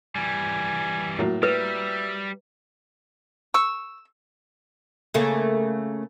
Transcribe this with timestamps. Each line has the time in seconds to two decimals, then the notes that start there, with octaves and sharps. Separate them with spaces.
0.15 E3 G3 G#5
1.19 A2 F#3 A#3
1.43 G3 B4 E5
3.54 C#6 E6
5.14 C#3 A3 A#3